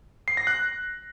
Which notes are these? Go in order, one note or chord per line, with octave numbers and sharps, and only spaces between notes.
C7
A#6
F#6